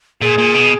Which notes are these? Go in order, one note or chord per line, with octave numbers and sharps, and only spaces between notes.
A#2 G#4
A#2
B2